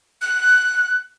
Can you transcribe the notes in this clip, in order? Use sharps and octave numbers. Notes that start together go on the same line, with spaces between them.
F#6